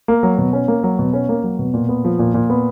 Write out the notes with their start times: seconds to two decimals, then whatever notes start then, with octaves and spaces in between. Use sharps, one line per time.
0.08 A#3
0.23 F#3
0.38 B2
0.53 C#4
0.68 A#3
0.83 F#3
0.99 B2
1.13 C#4
1.29 A#3
1.43 F#3
1.59 B2
1.74 A#2
1.89 B3
2.04 F3
2.19 A#2
2.34 A#2
2.50 B3